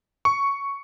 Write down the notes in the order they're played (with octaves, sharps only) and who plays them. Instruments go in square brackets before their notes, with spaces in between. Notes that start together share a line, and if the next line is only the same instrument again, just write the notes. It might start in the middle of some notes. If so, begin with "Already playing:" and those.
[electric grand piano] C#6